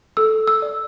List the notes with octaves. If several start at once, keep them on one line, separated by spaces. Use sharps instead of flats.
A4 E6
E6
D5